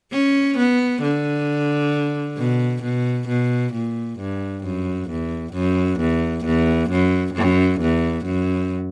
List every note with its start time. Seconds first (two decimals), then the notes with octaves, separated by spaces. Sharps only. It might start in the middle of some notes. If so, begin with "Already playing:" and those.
0.12 C#4
0.58 B3
1.02 D3
2.38 B2
2.83 B2
3.28 B2
3.73 A#2
4.19 G2
4.64 F#2
5.10 E2
5.54 F#2
6.00 E2
6.45 E2
6.90 F#2
7.34 F#2
7.81 E2
8.25 F#2